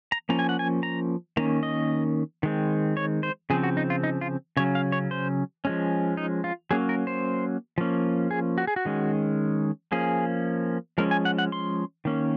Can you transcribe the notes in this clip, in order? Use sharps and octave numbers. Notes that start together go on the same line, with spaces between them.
A#5
F3 A#3 C#4 A#5
G#5
F#5
G#5
A#5
D#3 A#3 C#4 A#5
D#5
D#3 G#3 C4
C#5
C5
C#3 F3 C4 G#4
F#4
D#4
F4
D#4
F4
C#3 F#3 C#4 C#5
F5
C#5
C5
F3 G#3 C#4
D#4
F4
F#3 A#3 C#4 G#4
A#4
C5
F3 A#3 C#4
G#4
F#4
G#4
F#4
D#3 G#3 C#4
F3 A#3 C#4 G#4
F3 G#3 C#4 A#4
G#5
F#5
F#5
C6
D#3 A#3 C#4